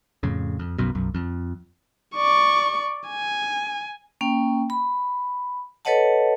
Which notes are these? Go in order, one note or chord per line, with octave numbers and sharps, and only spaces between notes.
F2 A2 C#3
F2
B1 F#2 B2
B1 F#2
F2
D5 C#6
G#5
A#3 C#4 G5
B5
A4 B4 C#5 D#5 F#5 A5